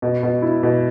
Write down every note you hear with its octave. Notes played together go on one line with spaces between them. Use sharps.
B2
B2
E4
B2